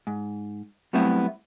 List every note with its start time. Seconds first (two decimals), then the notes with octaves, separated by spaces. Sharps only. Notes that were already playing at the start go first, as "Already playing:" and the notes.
0.07 G#2
0.93 F#3 G3 A3 B3 C4 E4